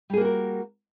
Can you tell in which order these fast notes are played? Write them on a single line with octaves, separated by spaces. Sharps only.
G3 G#4 A#3 F#4 A#4